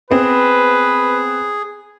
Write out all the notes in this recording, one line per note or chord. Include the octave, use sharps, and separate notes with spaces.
B3 C4 G#4 B4